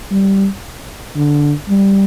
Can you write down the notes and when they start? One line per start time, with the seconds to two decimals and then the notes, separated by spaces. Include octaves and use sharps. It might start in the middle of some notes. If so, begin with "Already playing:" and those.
0.11 G3
1.16 D3
1.69 G3